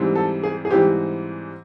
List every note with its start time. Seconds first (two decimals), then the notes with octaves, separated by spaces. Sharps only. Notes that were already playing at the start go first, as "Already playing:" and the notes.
Already playing: G#2 E3 G3 C4
0.15 A4
0.43 G#4
0.65 G#4
0.70 G#2 E3 G3 C4 G4